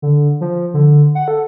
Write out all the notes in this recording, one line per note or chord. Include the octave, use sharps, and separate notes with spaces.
D3
F3
D3
F#5
A4